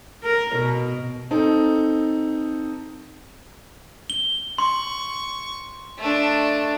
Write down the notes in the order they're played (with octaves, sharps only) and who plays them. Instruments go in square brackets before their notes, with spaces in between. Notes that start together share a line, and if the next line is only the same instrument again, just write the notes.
[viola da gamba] A#4
B2
[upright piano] C4 D#4 A4
[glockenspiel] G7
[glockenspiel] C6 [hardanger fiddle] C#6
[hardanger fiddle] A3 D4